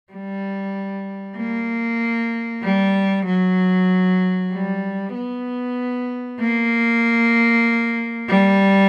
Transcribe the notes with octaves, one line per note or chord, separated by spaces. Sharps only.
G3
A#3
G3
F#3
G3
B3
A#3
G3